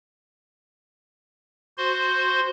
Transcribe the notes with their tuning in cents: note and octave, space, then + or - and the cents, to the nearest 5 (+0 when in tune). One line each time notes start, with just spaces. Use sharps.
F#4 -5 C5 +0 C6 +0